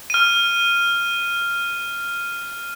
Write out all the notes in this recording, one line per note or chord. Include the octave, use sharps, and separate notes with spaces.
F6 D#7